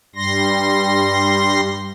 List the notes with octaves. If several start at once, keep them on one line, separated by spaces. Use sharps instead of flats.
G2 G3 C6 A#6